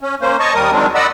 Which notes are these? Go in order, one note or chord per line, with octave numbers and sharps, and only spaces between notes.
C#4
A#3 C#4 C5
C#5 D#5 A5 C#6
D#2 G3 A#4 D#6
D#3 F#3 G#3 C4 D4
D5 D#5 F#5 B5 E6